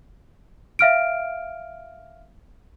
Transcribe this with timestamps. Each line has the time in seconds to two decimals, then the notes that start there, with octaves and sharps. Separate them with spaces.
0.79 E5 F5 F6 D7